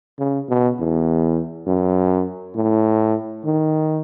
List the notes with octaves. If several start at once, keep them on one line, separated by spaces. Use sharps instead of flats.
C#3
B2
E2
F#2
A2
D#3